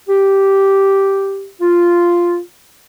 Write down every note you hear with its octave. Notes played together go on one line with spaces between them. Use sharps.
G4
F4